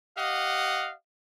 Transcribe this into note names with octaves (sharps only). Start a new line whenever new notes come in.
G4 D#5 F5 F#5